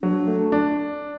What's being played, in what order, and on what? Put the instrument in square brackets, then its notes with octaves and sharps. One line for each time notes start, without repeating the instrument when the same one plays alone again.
[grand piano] F#3 [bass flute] D4
[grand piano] A3
D4